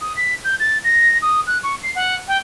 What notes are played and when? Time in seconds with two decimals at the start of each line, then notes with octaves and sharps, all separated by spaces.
0.01 D#6
0.17 B6
0.44 G6
0.60 A6
0.84 A#6
1.22 D#6
1.47 F#6
1.63 C#6
1.83 C7
1.95 F#5
2.28 G5